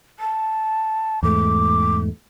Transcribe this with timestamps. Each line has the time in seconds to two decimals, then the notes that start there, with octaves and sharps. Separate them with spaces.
0.19 A5
1.23 E2 G#2 A3 D6